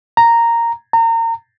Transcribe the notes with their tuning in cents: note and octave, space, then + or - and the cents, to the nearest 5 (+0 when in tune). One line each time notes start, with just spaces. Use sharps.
A#5 -5
A#5 -30